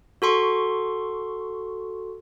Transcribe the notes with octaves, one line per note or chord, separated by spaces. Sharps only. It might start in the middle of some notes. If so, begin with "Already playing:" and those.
F#4 A4 C6 C#6